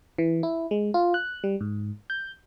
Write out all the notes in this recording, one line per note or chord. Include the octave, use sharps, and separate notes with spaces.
E3
E4
G#3
F4
F#6
G3
G#2
G6